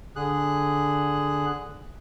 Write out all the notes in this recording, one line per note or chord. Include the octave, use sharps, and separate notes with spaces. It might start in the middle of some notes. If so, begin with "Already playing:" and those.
D3 G#4 F#6